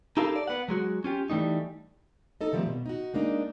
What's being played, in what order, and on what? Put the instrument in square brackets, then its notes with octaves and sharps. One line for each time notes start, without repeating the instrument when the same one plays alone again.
[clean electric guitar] D#4 E4 G4 A4 A#4 F5
D5
B3 F#5
F#3 G#3 F#4
C#4 F4 G4
E3 G3 A3 D#4
[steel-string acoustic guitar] D#4 A4 D#5
D#3 F3 G3 A3 C4
B2
D#4 F#4
G#3 A#3 D4 D#4